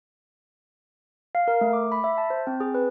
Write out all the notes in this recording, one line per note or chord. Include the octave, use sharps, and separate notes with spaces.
F5
A#4
A3
D6
B5
E5
A5
C5
C4
G#4
B4